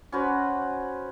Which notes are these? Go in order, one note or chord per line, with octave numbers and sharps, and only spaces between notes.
C#4 F#4 B4 C5